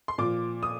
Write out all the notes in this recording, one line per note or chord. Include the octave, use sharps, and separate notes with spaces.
C6
A#2 F3 D6
D#6